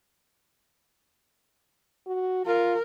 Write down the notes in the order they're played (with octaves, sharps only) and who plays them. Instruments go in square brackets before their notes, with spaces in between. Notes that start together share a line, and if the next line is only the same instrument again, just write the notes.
[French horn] F#4
[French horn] F4 [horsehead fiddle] A#4